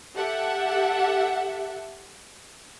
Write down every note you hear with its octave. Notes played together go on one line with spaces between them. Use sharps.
G4 A4 E5 F#5